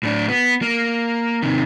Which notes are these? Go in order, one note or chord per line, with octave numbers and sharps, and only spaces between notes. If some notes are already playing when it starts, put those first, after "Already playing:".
A2 D4
B3
A#3
C3 D#3